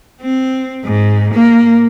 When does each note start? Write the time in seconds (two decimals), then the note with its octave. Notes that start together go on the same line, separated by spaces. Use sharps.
0.22 C4
0.84 G#2
1.34 A#3